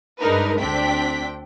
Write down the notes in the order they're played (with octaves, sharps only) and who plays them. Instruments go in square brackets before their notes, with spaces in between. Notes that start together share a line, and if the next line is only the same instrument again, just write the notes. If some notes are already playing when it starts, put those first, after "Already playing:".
[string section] G2 G#3 D4 D#4 A#4 B4
D2 C4 D4 G5 B6